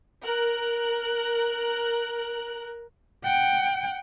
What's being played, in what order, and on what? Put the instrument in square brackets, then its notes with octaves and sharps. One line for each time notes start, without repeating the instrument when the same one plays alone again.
[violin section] A#4 F#6
[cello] F#5 G5